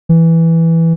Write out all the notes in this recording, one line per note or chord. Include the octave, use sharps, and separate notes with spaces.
E3